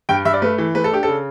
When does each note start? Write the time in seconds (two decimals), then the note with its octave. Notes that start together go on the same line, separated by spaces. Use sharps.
0.09 G2 G5
0.25 G2 E5
0.33 D5
0.42 A3 B4
0.58 E3
0.75 A3 B4
0.84 A4
0.91 D4 G4
1.03 C#3 A4